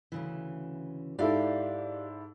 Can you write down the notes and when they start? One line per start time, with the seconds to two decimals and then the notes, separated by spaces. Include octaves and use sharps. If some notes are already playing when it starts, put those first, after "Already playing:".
0.12 D2 C#3 E3
1.19 G#2 E4 G4 A4 D5 F5